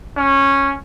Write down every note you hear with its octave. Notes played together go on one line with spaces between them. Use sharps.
C#4